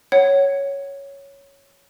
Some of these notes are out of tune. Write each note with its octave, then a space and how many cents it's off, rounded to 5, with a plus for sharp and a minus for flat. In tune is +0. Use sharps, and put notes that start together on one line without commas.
C#5 +0 F#5 +20